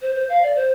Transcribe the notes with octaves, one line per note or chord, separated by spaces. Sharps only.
C5
C5
F5
D5
C5